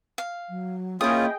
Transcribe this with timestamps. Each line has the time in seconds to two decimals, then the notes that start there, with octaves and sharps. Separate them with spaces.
0.18 F5
0.49 F#3
1.01 A#3 C#4 E4 F4 G#4 D#5 G5 D#6